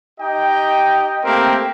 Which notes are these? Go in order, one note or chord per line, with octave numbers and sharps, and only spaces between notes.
D#4 G4 D#5 G5
A3 A#3 C4 G4 A#4